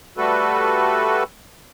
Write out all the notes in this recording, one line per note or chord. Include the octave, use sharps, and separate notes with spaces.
G3 A3 F#4 A4 B4